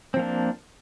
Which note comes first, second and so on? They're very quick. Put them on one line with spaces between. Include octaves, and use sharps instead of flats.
C4 F3 A#3 D4